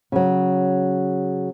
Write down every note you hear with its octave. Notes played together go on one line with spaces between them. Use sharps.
C#3 F#3